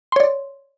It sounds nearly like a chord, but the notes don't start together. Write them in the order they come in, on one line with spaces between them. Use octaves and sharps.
C6 C#5 D5